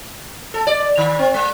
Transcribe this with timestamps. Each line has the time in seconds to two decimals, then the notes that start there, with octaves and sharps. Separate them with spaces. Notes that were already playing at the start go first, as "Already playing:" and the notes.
0.54 A4
0.67 D5
0.97 D#3
1.19 C4
1.34 G#3